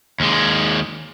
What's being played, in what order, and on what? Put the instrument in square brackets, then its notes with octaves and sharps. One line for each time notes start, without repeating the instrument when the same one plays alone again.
[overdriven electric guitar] D#2 G#3